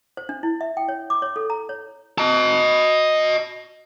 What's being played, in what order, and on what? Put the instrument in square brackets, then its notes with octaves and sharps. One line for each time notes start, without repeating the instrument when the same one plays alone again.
[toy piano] C5
D4
E4
E5
G5
C#5
D6
C#5
A4
A#5
C#5
[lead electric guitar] D#5 A5